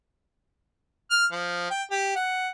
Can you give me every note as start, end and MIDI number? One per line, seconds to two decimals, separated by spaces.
1.11 1.26 89
1.32 1.66 53
1.70 1.83 79
1.91 2.11 67
2.16 2.49 78